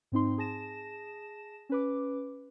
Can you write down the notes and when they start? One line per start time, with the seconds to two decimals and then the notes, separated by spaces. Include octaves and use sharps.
0.12 G#2 C4 D#4 C6
0.38 G#4 A5 A#6 E7
1.69 C#4 B4 D6